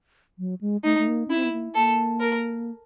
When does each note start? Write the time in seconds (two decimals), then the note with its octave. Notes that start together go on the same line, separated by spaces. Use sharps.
0.39 F#3
0.61 G#3
0.84 A3 D#4
0.99 A3
1.08 A#3
1.28 C#4 E4
1.36 C4
1.44 B3
1.52 A#3
1.75 A#3 A4
2.20 A#4